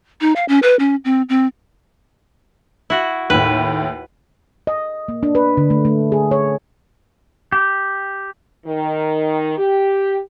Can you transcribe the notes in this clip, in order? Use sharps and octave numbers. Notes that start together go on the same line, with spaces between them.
D#4
F5
C#4
B4
C#4
C4
C4
E4 F#4
D#2 A2 B4
D#5
A#3
D4
B4
D3
A3
A3
G#4
C#5
G4
D#3
G4